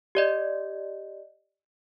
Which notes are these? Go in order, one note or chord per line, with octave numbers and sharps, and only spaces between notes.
G4 D5 D#5